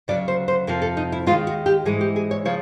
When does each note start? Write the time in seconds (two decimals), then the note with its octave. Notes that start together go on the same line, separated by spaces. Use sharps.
0.08 D2 C#3 F#3 D5
0.28 C5
0.48 C5
0.67 F2 C3 F3 A#4
0.82 A4
0.97 D#4
1.12 E4
1.26 D#2 D#3 G#3 F4
1.47 F#4
1.66 G4
1.85 G#2 E3 G#3 G#4
2.01 G4
2.16 G#4
2.31 C#5
2.45 C#3 F3 C#5